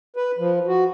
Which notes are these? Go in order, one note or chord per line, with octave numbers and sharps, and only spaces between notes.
B4
F3
F#4